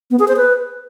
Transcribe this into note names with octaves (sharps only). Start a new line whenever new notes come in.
B3
G#4
C5
B4